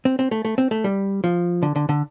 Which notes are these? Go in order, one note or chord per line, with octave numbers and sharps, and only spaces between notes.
C4
C4
A3
A3
C4
A3
G3
F3
D3
D3
D3